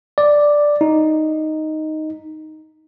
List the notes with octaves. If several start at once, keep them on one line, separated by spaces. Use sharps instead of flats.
D5
D#4